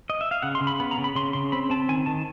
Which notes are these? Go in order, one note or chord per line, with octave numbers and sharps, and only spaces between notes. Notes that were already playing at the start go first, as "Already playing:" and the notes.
D#5
E5
F5
C#3 F#5
C6
C#3
B5
B3 B5
A#5
C#3
B5
C#3 C6
C#3 C6
C4 B5
C4 A5
D#3 G#5
D#3 A5